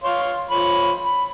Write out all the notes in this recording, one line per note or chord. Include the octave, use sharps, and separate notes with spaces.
C#5 F5 C6
F3 C#5 B5
B5